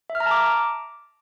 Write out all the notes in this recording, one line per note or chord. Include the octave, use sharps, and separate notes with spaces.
E5
F6
A#5
A5
D6